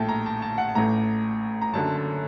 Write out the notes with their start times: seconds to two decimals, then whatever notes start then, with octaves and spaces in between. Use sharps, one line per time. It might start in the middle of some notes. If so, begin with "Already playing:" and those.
Already playing: A#1 A2 A3 G5 A5
0.09 A#5
0.26 A5
0.42 A5
0.58 F#5
0.69 A5
0.75 A1 A2 A3 A#5
1.61 A#5
1.73 F#1 F#2 D3 A5
1.97 A5